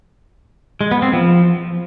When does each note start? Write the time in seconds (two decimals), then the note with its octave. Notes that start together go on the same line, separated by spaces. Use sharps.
0.81 G#3
0.91 B3
1.02 C4
1.13 F3